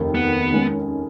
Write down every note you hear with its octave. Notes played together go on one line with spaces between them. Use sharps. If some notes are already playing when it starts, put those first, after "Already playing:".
Already playing: F1 D#2 D#3
B3
D#3 G#3 C#4